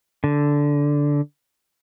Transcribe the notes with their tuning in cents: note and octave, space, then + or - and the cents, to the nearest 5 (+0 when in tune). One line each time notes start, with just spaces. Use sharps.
D3 -10